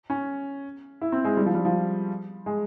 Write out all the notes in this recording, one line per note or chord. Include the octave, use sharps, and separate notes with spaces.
C#4
E4
C4
G#3
G3
F3
G3
F3
G#3